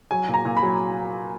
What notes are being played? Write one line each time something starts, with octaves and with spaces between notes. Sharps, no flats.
F#3 G#5
A#2
A#5
A#2
B5
F#3